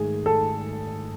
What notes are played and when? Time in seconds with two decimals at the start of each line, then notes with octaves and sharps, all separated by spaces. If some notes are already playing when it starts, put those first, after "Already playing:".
Already playing: G#2 D#3 A3 G#4
0.26 A4